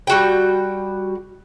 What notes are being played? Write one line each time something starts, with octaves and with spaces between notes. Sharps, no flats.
G3 F#4 G5